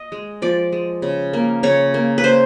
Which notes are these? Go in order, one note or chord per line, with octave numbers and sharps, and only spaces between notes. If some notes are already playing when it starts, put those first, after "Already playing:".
Already playing: D#5
G#3
F3 D5
G#3
C#3
A#3
C#3 C#5
A#3
B4
A#3 C5